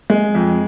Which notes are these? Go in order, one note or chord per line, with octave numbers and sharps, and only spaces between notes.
G#3
F2